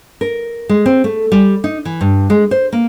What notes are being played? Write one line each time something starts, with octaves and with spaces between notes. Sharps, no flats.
A#4
G#3
C4
A3
G3
D#4
E3
G2
G#3
C5
A#3